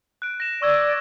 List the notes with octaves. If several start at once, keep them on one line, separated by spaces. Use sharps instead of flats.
F#6 D7
A#6 E7
D5 C#6 E6 G#6